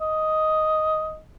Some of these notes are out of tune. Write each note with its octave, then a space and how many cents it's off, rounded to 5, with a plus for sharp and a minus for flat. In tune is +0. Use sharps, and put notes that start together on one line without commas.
D#5 +5